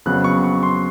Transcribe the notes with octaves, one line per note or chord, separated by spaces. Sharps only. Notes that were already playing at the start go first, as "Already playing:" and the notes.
F2 C#3 F#3 B3 F#6
C#6
C#6
C6